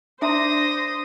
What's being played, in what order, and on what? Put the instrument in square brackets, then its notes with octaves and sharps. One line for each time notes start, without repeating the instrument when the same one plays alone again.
[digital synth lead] D4 [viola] C5 [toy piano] E5 A#5 C6 [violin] D#6 A#6